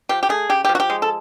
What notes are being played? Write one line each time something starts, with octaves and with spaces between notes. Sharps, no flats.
F3 G4
G4
A3 G#4
C#3 G4
F3 G4
F#4
G4
G#3
A4